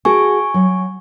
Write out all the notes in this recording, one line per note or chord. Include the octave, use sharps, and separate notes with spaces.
F#4 G#4 G#5 A5 C#6
F#3